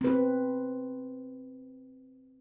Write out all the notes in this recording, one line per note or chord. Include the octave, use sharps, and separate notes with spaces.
C4 B4